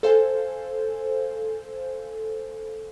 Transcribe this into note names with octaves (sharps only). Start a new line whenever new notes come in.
A4 C5 F5 G#5